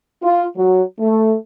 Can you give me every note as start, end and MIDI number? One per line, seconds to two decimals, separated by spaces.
0.22 0.45 65
0.56 0.82 54
0.98 1.34 57